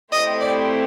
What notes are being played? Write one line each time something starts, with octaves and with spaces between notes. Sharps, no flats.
A3 C4 E4 G4 C5 D#5
D5